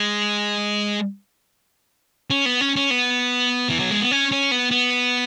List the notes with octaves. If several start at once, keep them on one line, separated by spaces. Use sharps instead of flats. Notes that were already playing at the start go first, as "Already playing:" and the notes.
Already playing: G#3
C#4
B3
C#4
C#4
B3
E3
F#3
G#3
B3
C#4
C#4
B3
B3